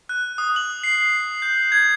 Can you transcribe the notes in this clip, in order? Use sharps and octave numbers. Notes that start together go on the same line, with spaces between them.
F#6
D#6
F#7
C7
G6
G#6